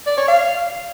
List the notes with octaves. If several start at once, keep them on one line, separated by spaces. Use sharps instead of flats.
D5
C#5
F5